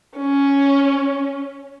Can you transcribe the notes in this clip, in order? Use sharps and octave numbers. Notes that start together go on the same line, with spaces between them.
C#4